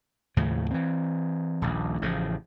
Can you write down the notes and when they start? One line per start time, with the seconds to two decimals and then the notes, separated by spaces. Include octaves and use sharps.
0.36 D#2 A2 C#3 F3
0.71 E3 C4
1.62 D#1 A#1
2.02 A1 A2 C#3 F3